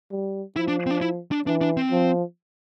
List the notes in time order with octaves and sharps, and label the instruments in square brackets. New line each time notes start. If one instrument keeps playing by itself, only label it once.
[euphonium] G3
[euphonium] F3 [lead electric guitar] E4
[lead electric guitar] D4
C4
D4
E4
D4
[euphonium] E3 [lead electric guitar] D4
[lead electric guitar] D4
C4
[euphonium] F3